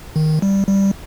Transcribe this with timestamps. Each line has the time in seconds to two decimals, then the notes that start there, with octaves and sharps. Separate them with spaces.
0.16 D#3
0.42 G3
0.67 G3